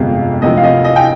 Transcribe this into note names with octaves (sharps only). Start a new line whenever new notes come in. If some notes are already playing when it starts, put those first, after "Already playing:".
Already playing: G1 F2 C3 F3 G#3 F5
D2 C3 F3 D#5
F5
D#5
D#5
G5